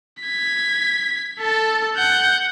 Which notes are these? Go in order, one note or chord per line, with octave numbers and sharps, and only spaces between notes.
G#6 B6
A4 A5
F#5 G6